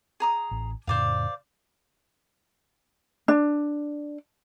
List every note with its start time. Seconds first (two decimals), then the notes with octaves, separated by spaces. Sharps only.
0.20 G#4 A#5 D#6
0.51 A1
0.87 F2 A2 C#3 C5 D5 F5
3.28 D4